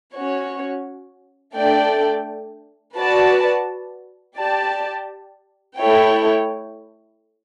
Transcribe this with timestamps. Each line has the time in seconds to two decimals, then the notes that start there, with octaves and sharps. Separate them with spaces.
0.15 C#4 F#4 C#5
1.55 A3 D4 A4 D5 G5
2.97 F#4 B4 D5 A5
4.38 G4 D5 A5
5.78 A3 E4 A4 C#5 G5